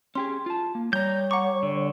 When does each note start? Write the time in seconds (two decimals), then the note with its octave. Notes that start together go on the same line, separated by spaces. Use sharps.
0.15 C#4 G4 G#4 C6
0.46 F4 A5
0.75 A#3
0.93 G3 C#5 A#5 G6
1.31 F#5 A#5 C#6 D6
1.63 D3